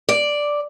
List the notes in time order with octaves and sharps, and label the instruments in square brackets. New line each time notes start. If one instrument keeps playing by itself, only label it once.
[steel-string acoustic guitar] D5